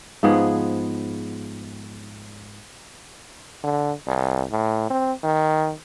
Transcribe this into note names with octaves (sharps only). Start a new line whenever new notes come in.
G#2 F3 B3 G#4
D3
C2
A2
C4
D#3